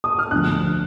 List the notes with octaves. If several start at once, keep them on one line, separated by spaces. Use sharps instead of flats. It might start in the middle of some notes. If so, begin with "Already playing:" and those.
D#6
F6
D2 D3 F3 F#6